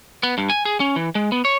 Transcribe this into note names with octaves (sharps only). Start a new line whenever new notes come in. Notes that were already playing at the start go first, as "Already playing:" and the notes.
B3
G2
G#5
G#4
C#4
E3
G#3
B3
C#5